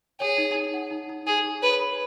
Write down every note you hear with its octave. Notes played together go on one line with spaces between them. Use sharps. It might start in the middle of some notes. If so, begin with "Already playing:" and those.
G#4 C#5
D#4
D#4
F#5
D#4
D#4
D#4 G#4
G#4
B4 C#5
B5